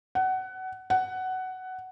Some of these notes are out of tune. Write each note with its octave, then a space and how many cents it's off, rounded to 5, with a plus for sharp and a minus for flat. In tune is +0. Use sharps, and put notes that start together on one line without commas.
F#5 +25
F#5 +15